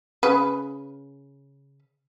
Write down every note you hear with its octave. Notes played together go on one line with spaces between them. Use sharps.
C#3 B4